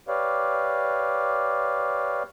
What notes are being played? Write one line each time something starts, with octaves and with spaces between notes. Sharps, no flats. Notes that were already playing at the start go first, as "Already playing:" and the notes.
G4 B4 C#5 D5 F5